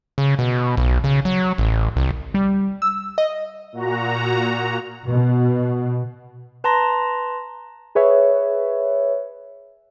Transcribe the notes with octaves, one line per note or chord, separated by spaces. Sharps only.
C#3
B2
B1
C#3
F#3
A1
C2
G3
E6
D#5
A#2 F#4 A#5
B2
B4 A5 A#5 C6 A#6
G#4 B4 C#5 E5